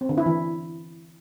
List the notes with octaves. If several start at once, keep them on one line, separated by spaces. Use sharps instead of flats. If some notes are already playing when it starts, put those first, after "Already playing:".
C4
D3
E4
E3